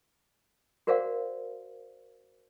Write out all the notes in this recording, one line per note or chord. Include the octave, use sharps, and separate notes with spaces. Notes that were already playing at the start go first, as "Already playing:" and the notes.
F#4 A#4 C5 D5 F5 F#5